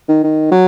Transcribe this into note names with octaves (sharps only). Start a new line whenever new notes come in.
D#3
D#3
F#3